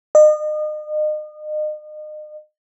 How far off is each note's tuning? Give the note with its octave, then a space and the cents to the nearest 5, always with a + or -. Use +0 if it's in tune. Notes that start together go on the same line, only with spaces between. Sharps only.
D#5 -35